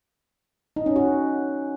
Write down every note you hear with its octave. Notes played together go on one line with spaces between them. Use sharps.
D#4
C#4
F#4